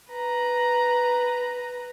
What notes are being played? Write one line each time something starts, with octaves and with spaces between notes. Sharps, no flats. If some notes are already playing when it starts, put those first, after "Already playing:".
B4 A#5